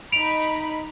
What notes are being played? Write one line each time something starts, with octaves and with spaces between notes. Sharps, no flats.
D#4 B5 D7 F7